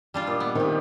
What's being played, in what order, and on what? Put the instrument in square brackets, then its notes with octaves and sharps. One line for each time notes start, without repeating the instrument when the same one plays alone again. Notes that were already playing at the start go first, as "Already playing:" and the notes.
[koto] G3 D4 F4
[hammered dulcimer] A#2 D5 D#5
[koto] B3
[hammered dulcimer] C3 G4 [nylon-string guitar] D#3